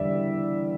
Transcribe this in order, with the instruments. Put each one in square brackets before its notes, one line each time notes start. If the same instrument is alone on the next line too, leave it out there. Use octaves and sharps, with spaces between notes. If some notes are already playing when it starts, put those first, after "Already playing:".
Already playing: [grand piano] E2 D3 G3 D5 E5